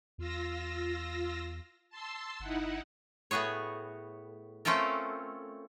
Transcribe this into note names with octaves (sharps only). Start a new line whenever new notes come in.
E2 F4 E6 A#6
A5 C6 E6
G1 D#4 E4 F#5
A2 B3 F#4 G#4 C#5
A3 C4 C#4 F4 A4 A#4